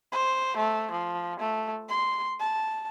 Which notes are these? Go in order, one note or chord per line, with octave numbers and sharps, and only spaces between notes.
C5
A3
F3
A3
C6
A5